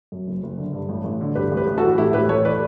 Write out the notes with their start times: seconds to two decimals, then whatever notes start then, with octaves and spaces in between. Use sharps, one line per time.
0.12 F#2
0.27 F#1
0.43 F#1
0.58 D3
0.73 G2
0.89 A1
1.04 A1
1.21 D3
1.35 G2 G4 B4
1.52 A1
1.57 G4 B4
1.67 A1
1.78 F#4 A4
1.83 E3
1.98 A2 E4 G4
2.13 A1 G4 B4
2.29 A1 A4 C#5
2.44 E3 B4 D5